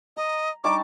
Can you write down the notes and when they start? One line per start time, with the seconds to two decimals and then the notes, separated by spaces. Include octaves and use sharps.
0.17 D#5 A#5
0.64 G3 D4 D#4 A5 C#6 D6